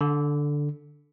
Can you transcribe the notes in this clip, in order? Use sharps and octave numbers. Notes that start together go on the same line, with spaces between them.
D3